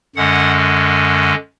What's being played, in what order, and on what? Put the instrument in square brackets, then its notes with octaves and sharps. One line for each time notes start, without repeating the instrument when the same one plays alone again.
[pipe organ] F#2 D3 G#3 C#4 F#5